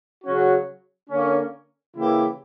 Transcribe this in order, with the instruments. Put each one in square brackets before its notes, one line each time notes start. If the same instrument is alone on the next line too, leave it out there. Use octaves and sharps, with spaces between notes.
[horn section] C#3 F#3 C#4 F#4
D3 A#3 C#4
C#3 E3 A#3 E4 G4